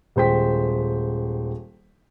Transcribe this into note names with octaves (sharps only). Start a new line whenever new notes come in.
D#1 G#3 C5 G5 B6